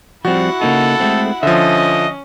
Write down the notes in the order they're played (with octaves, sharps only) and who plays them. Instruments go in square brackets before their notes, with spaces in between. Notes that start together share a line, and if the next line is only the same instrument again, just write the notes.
[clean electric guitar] F3 G3 C4 [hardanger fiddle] E4 F#5 [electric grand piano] F#4
[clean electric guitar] C#3 A#3 D#4 [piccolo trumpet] A4
[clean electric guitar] G#3 A3 C4
[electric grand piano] D3 F3 [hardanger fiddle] C#4 [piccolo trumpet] D#5 [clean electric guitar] E5